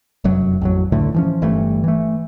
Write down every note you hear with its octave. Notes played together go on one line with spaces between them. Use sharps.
F1 F#2 F#3
A1 F2 F#3
C#2 A2 D3 A3
E3 F3 C#4
G1 G2 E3 A3
E3 A3